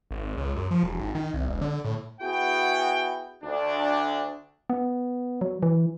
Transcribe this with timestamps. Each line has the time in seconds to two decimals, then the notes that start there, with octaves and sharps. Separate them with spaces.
0.11 G#1
0.37 C#2
0.56 F#2
0.71 F3
0.83 E1
0.99 G#1
1.15 D#3
1.34 C2
1.48 E1
1.61 D3
1.85 A2
2.21 B3 E4 F#4 G#4 G5
3.44 D2 D4
4.70 B3
5.41 F#3
5.63 E3